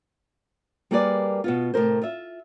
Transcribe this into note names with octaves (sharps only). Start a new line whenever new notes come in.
G3 A#3 G#4 A#4 B4 D5
B2 B3 F4
A2 C3 A#4 C5
F4 E5